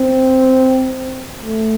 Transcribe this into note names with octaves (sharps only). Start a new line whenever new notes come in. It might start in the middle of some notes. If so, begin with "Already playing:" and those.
Already playing: C4
A3